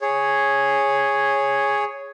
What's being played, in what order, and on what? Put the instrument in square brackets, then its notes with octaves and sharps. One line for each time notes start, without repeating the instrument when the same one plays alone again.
[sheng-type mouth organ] G#4 C#5